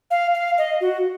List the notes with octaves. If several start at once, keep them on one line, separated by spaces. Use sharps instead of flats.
F5
F5
D#5
F#4